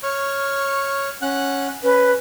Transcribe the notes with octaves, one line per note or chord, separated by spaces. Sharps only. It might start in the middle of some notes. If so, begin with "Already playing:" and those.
C#5 C#6 F6
C#4 F#5 F#6
C#4 B4